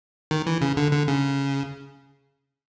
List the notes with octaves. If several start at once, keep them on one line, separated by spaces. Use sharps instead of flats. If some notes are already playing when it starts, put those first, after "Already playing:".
D#3
E3
C#3
D3
D3
C#3